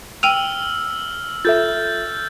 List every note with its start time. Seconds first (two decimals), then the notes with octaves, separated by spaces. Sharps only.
0.23 G5 E6 F6 D#7 F7
1.45 F4 A4 E5 G6 A6